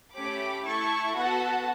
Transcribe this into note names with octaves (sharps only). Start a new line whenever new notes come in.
A3 C#4 G4 B5 D6
A3 E4 A4 A5 C#6
B3 F#4 A4 F#5 A5